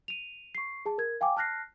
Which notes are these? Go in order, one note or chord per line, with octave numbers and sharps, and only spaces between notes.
D#7 F7
C#6 C7
G#4 A5
A#4 G#6
F5 G5 G#5 D6
A5 F6 F#6 A#6 C7